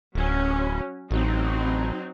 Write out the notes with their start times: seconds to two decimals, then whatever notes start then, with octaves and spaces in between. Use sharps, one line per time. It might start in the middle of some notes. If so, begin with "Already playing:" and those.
0.15 D1 F#3 C#4
1.11 A1 F#3 C4 D#4